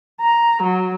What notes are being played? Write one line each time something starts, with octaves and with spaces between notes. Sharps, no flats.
A#5
F#3